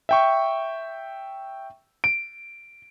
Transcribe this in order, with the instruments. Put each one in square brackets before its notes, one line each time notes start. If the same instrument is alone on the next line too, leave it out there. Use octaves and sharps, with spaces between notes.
[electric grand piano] E5 G5 C#6
D7